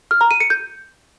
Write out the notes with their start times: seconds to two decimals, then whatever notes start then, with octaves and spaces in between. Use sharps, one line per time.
0.11 F6
0.21 A#5
0.31 D#7
0.40 C#7
0.50 G6